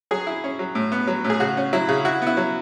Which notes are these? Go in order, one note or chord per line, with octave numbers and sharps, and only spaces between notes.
F#3 G#4
E4
C#4
F#3
A2
B3
F#3
A2
G#4
C#3 F#4
C#4
F#3 E4
C#3
E4 F#4
B3 E4
F#3